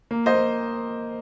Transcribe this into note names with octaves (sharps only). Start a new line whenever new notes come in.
A#3
C5 D#5
A#3